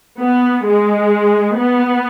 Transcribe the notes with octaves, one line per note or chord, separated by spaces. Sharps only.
B3
G#3
B3